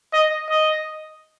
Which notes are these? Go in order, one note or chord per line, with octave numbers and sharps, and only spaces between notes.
D#5
D#5